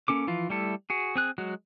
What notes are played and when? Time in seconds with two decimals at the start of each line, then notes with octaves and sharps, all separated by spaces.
0.08 A#3 C#4 A4 D6
0.27 E3 F3 F4
0.50 G3 A3 E4 A4
0.90 F#4 G#4
1.16 C4 G#4 F#6
1.38 F#3 G#3 F#4